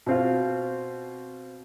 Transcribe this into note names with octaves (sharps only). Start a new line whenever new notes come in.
B2 C4 F4